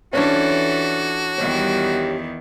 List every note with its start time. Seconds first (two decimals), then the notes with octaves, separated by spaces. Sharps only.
0.13 E3 C#4 D4 F4 F#4 A4 B4 C#5
1.38 E2 D#3 G3 G4 C#5